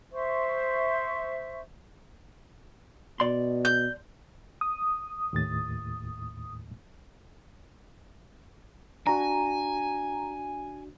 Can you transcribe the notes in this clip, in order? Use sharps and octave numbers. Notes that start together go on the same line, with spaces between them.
C5 E5 C6 C#6
B2 D5 C6
G6
D#6
D#2 A2 A6
D4 F#4 G#5 A#5